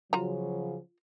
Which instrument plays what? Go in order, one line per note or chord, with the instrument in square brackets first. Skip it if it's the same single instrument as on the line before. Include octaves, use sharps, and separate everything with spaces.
[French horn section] C#3 F3 F#3 [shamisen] F4 A#5